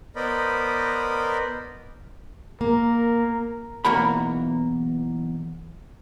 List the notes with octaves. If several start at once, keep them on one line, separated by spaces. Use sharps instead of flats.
B3 A#4 C5 D5 D#5 B5
A#3 A#4
B1 E2 A#3 F#4 A#4 B5